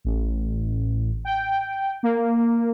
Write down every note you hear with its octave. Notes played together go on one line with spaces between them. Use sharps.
A1
G5
A#3